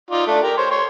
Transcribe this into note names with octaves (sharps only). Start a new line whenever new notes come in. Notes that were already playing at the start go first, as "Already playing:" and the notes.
D#4 F4 D5
A3 D4
G4 A#4
C5 C#5
C#5 C6